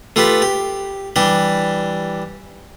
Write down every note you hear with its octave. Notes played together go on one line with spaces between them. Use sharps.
A3 F4 G4 B4
G4
E3 G3 D4 G4